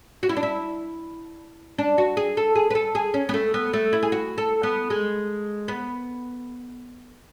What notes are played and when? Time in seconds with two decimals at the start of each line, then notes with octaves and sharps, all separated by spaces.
0.23 F#4
0.29 E4
0.37 D4
0.43 E4
1.78 D4
1.98 F#4
2.17 G#4
2.37 A4
2.55 G#4
2.70 B4
2.75 A4
2.95 G#4
3.14 C#4
3.29 B3
3.34 A3
3.54 B3
3.73 A3
3.93 E4
4.03 G#4
4.12 F#4
4.38 A4
4.63 B3
4.90 G#3
5.68 B3